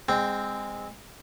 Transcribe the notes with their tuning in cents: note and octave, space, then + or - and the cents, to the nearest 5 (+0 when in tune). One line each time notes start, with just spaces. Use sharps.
G#3 -20 C4 -5 G5 +0